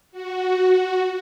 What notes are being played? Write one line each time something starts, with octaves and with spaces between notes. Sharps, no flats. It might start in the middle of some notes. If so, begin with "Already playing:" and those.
F#4